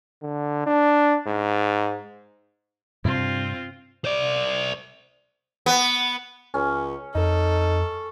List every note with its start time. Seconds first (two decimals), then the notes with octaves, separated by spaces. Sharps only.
0.22 D3
0.66 D4
1.27 G#2
3.05 G2 C3 C4 D4 F4
4.05 C5 D5
5.66 B3
6.54 C#2 C#4
7.15 F2 D#4 A4